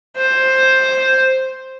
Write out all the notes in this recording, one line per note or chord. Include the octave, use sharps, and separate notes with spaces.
C5